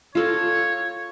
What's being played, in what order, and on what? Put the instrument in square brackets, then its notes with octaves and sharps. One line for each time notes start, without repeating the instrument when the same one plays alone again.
[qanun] F4 A4 A#4 [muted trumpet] C#5